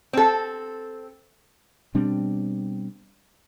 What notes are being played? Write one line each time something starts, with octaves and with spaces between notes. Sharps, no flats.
C4 A4
B2 G3 C4 D4